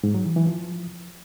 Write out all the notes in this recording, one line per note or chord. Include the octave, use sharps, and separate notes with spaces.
G#2
F#3
E3
E3
F3